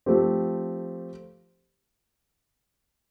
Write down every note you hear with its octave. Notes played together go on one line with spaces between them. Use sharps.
F3 A3 C4 G4